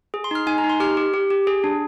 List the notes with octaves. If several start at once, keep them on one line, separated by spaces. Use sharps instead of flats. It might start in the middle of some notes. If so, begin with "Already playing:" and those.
G#4
C6
D#4 F6
D#4 G#5
A#5
D#4
C6
G4 F6
G4
G4
G4
G#4
D4